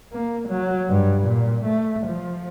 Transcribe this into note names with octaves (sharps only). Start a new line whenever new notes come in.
A#3
F#3
G2
A#2
A3
F3